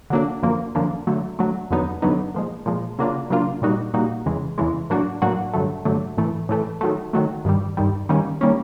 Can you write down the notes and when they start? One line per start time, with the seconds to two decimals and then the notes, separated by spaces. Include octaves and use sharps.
0.10 D3 F#3 A#3 D4
0.43 F#2 D3 F3 A#3
0.75 F#2 D3 F3 A#3
1.07 D3 F#3 A3
1.39 D3 F#3 A3
1.71 F2 D3 F#3 B3 D#4
2.02 F2 D3 F#3 B3 D#4
2.34 A#2 F3 G#3
2.66 A#2 F3 G#3
2.99 C#3 F#3 A#3 D4 F4
3.30 C#3 F#3 A#3 D4 F4
3.62 A#2 G3 A#3 D#4 F#4
3.94 A#2 G3 A#3 D#4 F#4
4.26 E2 C#3 E3 G#3
4.58 E2 C#3 E3 G#3
4.90 A2 F#3 A#3 D4 F#4
5.22 A2 F#3 A#3 D4 F#4
5.53 G2 D3 F#3 A3
5.85 G2 D3 F#3 A3
6.17 A2 E3 A3
6.49 A2 E3 A3
6.81 D#3 F#3 A3
7.13 D#3 F#3 A3
7.45 G2 D#3 G3
7.77 G2 D#3 G3
8.09 D#3 G3 A#3 C#4
8.41 D#3 G3 A#3 C#4